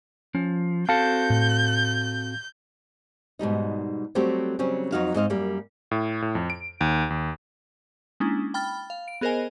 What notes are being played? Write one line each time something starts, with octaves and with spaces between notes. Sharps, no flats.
F3 C#4
C4 F#4 A4 F5 A5 G6
A2
G#2 B2 G3 D#4
F#3 G3 A3 C4 F#4 G4
C#3 F#3 G3 C4 C#4
F2 F#3 D#4 F#4 F5
G#2 C4 D#5 F5
F#2 G3 A#3
A2
A2
F2
D7
D#2
D#2
G#3 A#3 C#4 D4 E4
G5 B5 F6 A6
F5
D7
B3 G#4 A#4 C5 D#5 G#5